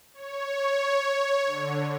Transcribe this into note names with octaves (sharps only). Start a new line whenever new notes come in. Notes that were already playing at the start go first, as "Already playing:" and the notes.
C#5
D3